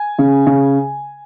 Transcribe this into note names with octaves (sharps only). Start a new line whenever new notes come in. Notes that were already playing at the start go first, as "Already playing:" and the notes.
Already playing: G#5
C#3
C#3